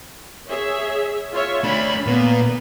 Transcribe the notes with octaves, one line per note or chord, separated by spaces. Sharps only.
G#4 C#5 E5
F4 C#5 E5
A3 D4 B5
A#2 B3